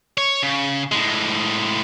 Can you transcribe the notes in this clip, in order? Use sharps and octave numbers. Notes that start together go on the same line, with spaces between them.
C#5
C#3
A2 G#3